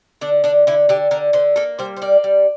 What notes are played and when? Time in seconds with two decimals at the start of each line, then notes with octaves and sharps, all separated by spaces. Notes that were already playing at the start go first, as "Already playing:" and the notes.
0.21 D3 D4
0.44 D3 D4
0.67 D3 E4
0.89 D3 G4
1.11 D3 A#4
1.33 D3 C5
1.56 A#3 A4
1.79 G3 C5
1.97 C5
2.02 A#3 D5
2.24 G3